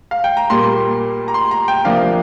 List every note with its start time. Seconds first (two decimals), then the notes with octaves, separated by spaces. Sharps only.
0.11 F5
0.24 G5
0.37 A#5
0.50 A#2 G3 A#3 C6
1.28 A#5
1.34 C6
1.51 A#5
1.68 G5
1.85 C3 F3 A#3 D4 F5